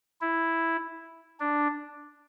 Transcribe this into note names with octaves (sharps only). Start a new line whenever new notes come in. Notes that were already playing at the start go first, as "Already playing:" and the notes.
E4
D4